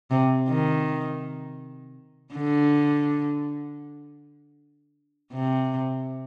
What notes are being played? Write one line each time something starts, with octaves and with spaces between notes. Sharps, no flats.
C3
D#3
D3
C3